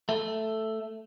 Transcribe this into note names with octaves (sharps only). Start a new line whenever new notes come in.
A3